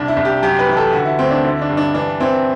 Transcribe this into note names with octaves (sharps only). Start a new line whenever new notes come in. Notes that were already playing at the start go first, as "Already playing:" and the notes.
Already playing: C2 D4
E4
C2
G4
F#2 G4
B4
E3
A4
D3 F#4
E4
D2 C4
D4
D3 E4
D4
G2
D4
E3 D4
E3 C4